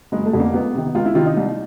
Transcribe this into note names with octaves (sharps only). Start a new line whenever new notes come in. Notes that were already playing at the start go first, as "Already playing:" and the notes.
F#1 G#3
A3
F2 D3
A#3
C#2 B3
C3 D#3
C#2 F4
E4
C3 D#3 F4
D#4
C2